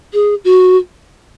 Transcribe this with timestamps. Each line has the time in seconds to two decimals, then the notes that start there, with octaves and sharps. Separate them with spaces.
0.13 G#4
0.44 F#4